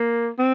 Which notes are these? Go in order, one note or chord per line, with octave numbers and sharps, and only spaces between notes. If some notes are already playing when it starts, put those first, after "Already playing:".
Already playing: A#3
C4